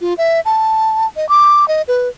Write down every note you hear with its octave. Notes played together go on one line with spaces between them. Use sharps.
F4
E5
A5
D#5
D6
D#5
B4